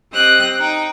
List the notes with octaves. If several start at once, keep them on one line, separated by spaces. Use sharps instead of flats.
C4 G4 D#5 F#6
D#4 G5